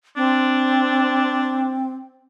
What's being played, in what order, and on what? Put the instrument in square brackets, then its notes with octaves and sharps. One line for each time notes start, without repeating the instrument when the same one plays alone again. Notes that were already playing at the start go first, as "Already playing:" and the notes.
[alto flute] C4 [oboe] D4